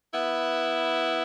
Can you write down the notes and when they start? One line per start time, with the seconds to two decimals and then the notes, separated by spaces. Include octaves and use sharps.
0.12 B3 E4